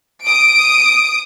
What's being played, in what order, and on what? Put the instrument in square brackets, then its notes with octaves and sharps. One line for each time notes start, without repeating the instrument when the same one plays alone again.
[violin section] D#6 D7